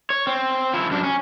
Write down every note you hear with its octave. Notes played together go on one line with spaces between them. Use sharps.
C#5
C4
F3 E4
F#2 D4
C#4